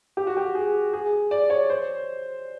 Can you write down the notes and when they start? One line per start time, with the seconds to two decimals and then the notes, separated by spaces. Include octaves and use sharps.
0.17 G4
0.27 F#4
0.37 G4
0.55 G#4
0.93 G#4
1.31 D5
1.50 C#5
1.70 C5